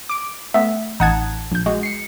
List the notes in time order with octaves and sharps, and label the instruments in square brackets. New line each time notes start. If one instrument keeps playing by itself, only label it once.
[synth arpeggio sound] D6 D7
[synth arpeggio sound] A3 B3 [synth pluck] E5
[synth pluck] A1 F#5 A5 [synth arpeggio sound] D#4 D#6 G#6
[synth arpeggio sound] A#1 G6
G#3 F#4
[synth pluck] C7 C#7